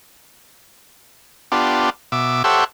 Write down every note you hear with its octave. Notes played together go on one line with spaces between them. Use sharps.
B3 D4 F4 G4
B2 E5 D6
G4 A4 C5 C#5 E5 F#5